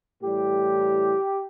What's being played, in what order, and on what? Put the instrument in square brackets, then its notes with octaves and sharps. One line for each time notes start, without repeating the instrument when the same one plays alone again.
[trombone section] A2 E3 G3 G4